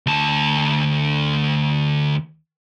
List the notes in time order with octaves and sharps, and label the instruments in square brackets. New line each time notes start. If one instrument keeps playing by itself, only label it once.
[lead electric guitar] D2 A5